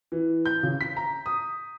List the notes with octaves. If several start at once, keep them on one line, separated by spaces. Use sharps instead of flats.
E3
G6
C#3
B6
A#5
D#6